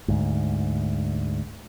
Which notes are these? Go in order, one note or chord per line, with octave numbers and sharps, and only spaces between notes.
D2 G#2